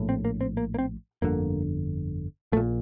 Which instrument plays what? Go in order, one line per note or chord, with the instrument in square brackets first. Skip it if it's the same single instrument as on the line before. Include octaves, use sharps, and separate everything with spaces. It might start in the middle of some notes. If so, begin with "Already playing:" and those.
Already playing: [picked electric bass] A#1 A2
C4
A#3
C4
A#3
A#3
C4
G1 F2 D3 A#3
A#1 A3
A#2